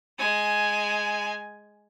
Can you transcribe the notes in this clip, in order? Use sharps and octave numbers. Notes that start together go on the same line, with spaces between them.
G#3 G#5